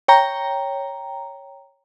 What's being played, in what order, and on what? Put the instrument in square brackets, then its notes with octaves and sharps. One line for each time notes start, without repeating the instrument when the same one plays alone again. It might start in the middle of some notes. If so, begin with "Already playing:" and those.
[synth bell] C#5 G5 A#5